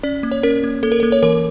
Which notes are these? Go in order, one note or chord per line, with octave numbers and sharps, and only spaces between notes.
C#4 D5
A#3
C#5
C#4 A#4
A#3
A#3 A4
A#4
A4
A#3
C#5
E3 A#4